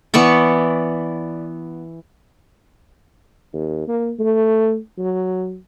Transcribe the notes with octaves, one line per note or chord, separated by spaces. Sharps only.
E3 B3 D5 C#6
D#2
A#3
A3
F#3